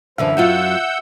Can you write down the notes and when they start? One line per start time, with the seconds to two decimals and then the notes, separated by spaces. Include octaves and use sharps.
0.18 F#2 D3 E3 F3 E5
0.37 F#2 F#3 F4 F#5 E6 G6